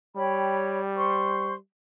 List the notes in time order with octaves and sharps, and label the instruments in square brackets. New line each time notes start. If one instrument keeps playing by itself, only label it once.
[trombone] G3 [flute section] C#5 G5 B5
[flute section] C5 C6 C#6